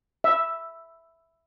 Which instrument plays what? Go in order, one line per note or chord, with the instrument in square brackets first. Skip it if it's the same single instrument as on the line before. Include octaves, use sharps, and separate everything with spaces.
[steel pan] E5